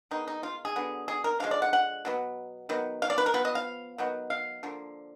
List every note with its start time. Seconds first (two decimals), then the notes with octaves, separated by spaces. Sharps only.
0.11 D#3 G#3 B3 D#4
0.28 D#4
0.43 F4
0.65 G#4
0.76 D3 F#3 B3
1.08 G#4
1.24 A#4
1.40 D3 F3 G#3 F5
1.51 D5
1.62 F#5
1.73 F#5
2.05 B2 F#3 B3
2.69 D#3 F#3 B3
3.02 F5
3.10 D5
3.18 B4
3.26 A#4
3.34 F3 B3 B4
3.45 D#5
3.55 F5
3.98 D#3 F#3 B3
4.30 F5
4.63 D3 F3 A#3